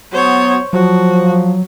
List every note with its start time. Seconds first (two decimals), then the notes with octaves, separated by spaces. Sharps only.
0.13 F#3 B3 C5 C#5
0.73 F3 F#3 F#4